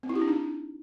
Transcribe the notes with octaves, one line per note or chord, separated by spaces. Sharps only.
C4
E4
G4
D4
D#4